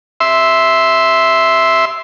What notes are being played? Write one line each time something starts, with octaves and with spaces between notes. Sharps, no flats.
E5 C6